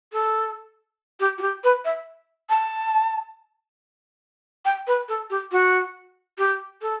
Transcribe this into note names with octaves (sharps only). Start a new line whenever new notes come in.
A4
G4
F#4
G4
B4
E5
A5
G5
B4
A4
G4
F#4
G4
A4